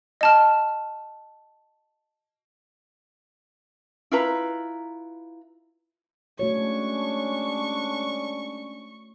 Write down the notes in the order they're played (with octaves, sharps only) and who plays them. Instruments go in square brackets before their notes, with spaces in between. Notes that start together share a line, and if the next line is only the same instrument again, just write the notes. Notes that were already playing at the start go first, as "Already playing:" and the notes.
[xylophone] D#5 A5 F6
[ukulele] E4 F4 B4 A#5
[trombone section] G#3 C#4 D4 [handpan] A3 F#4 C#5 [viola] C#6